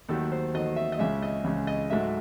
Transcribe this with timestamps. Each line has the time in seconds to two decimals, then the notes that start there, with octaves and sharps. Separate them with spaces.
0.09 D#2 D#3 F#3 A3 A4
0.32 C5
0.54 D#2 D#3 F#3 A3 D#5
0.76 E5
0.92 D#5
0.99 C#2 C#3 G#3 E5
1.23 D#5
1.44 C#2 C#3 G#3
1.67 D#5
1.90 G#2 F#3 A3 E5